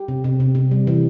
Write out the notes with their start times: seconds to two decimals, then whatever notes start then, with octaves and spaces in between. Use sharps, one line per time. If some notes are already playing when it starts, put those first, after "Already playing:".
Already playing: G4
0.08 C3
0.24 C3
0.40 C3
0.55 C3
0.71 G3
0.87 E3